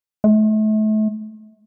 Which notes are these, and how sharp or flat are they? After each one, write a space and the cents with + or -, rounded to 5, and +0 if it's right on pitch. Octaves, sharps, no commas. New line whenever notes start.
A3 -35